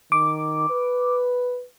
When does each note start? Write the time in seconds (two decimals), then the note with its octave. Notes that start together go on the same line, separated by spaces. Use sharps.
0.12 D#3 D6
0.70 B4